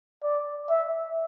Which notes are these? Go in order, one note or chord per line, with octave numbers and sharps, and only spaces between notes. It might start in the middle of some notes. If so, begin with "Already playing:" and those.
D5
E5